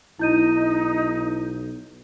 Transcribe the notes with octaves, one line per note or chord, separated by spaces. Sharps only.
B1 D#4 E4 G6 D#7